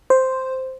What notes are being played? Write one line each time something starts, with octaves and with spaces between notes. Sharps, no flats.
C5